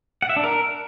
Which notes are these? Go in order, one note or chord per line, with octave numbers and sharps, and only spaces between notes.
F#5
E5
D4
A#4